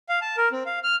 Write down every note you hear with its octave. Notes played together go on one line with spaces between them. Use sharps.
F5
A5
A#4
C4
F5
F6